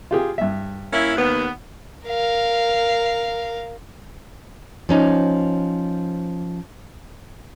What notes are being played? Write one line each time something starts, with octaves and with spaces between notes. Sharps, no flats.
F4 G4 G#4
G2 E5
A#3 C#4 E4
D#2 B3
A#4 F5
F3 C#4 D#4